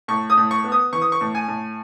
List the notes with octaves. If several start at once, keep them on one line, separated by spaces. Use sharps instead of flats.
A2 C#6
D#6
A2
C#6
B3
D#6
E3 C#6
D#6
C#6
A2
G#5
A2